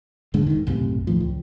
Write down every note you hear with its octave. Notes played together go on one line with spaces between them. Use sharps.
D#1 G#2 D3 G#3
F1 D#3
B1 F#2 A2 C3
D#2 A2 F3
C#2